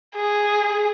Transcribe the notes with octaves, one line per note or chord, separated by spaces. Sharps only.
G#4